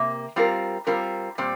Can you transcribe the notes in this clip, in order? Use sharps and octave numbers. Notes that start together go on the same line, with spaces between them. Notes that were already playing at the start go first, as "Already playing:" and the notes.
Already playing: C3 A#3
G3 C4 F4 A#4
G3 C4 F4 A#4
A#2 G3 C4